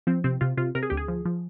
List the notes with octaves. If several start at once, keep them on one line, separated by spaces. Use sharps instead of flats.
F3 C4
C3 C4
C3 F4
C3 F4
C3 A#4
G#4
D2 G4
G#4
F3
F3